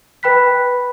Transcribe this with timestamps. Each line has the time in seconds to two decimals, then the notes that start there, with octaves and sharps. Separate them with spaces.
0.23 B4 G5 B5 F#6 B6